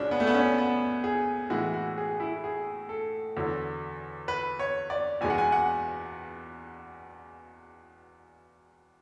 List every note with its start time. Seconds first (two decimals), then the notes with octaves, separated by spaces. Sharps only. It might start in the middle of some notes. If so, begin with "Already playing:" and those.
Already playing: C#2 B2 G#3 C#4 D4
0.11 B3
0.20 A3
0.27 B3
0.34 C#4
0.58 B3
1.04 G#4
1.50 A2 E3 G#3 F#4
1.74 F#4
1.98 G#4
2.20 E4
2.44 G#4
2.89 A4
3.37 E2 D3 F#3
4.28 B4
4.59 C#5
4.90 D5
5.21 E2 B2 G#3 G#5
5.30 F#5
5.38 G#5
5.52 F#5